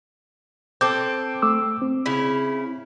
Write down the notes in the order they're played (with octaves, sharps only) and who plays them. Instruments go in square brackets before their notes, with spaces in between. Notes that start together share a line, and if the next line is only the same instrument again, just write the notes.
[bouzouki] C4 A4 [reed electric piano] D6 G6
[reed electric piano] A3 D6 E6
C4
[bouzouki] C#3 E4